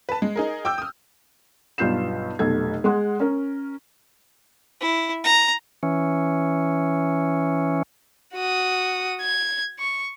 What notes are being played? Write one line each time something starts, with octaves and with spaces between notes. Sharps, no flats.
B4 A5
G#3
D#4 G#4 A#4
G5 D6 E6 G6
D#6 F6
B1 G2 F4 G6 C7 E7
F1 B1 A4 G#6
G#3 F#5 C6
C#4 A#4
E4
A#5
E3 C#4
F#4 D#6
G#6
C#6